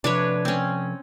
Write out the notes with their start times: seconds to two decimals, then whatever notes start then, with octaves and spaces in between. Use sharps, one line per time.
0.04 C3 F3 D4 B4 C#5
0.45 C4 C#4